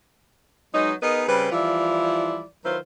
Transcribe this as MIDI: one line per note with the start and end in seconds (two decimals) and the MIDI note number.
0.74 0.94 54
0.74 0.94 56
0.74 0.94 59
0.74 0.94 63
1.02 1.24 59
1.02 1.24 63
1.02 1.24 68
1.02 1.24 70
1.02 1.24 71
1.02 1.24 75
1.28 1.50 49
1.28 1.50 55
1.28 1.50 60
1.28 1.50 71
1.52 2.44 52
1.52 2.44 53
1.52 2.44 55
1.52 2.44 64
1.52 2.44 65
1.52 2.44 74
2.65 2.78 51
2.65 2.78 54
2.65 2.78 64
2.65 2.78 65
2.65 2.78 71
2.65 2.78 72